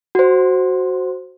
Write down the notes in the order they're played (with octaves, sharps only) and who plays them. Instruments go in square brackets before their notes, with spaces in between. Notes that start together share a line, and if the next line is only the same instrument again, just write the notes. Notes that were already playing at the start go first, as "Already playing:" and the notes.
[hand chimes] F#4 C5